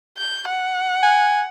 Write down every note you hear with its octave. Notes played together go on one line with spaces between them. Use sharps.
G6
F#5
G#5